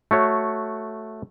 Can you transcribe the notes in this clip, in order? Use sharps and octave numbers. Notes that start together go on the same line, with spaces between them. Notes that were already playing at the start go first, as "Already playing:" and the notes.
A3 F#4 C#5